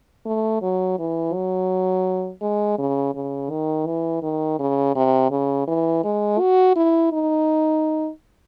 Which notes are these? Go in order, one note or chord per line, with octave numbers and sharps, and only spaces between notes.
A3
F#3
E3
F#3
G#3
C#3
C#3
D#3
E3
D#3
C#3
C3
C#3
E3
G#3
F#4
E4
D#4